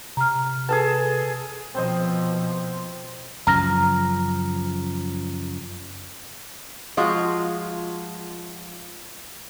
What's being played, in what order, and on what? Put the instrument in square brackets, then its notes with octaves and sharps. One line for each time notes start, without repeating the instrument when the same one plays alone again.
[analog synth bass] C3 [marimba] A#5 F6
[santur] G#4 A4 A5 [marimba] B4
[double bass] B2 F3 [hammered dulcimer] C4 C5 D#5
[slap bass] F#2 C#3 F3 [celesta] A#5 F6 A#6
[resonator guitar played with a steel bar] F3 G#3 F4 F#4